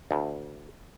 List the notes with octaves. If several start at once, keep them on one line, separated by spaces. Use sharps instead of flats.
D2